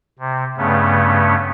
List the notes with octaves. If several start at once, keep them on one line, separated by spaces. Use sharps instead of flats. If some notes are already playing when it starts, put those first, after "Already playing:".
C3
G2 C#3 A3 B3 C#4